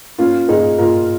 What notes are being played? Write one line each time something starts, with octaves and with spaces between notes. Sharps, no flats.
A#3 C#4 F4
A#2 D#4 G#4
A#2 F4 A#4